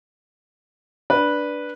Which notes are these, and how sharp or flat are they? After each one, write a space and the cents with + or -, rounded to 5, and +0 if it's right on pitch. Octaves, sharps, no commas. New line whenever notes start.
D4 +0 B4 -10 D5 +0